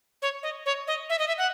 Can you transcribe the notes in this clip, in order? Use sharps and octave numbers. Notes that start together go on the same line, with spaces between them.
C#5
D#5
C#5
D#5
E5
D#5
E5
F#5